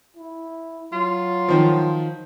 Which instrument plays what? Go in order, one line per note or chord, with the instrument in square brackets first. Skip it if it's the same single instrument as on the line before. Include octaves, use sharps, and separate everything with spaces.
[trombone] E4
[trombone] F#3 [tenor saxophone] F4
[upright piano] D#3 F3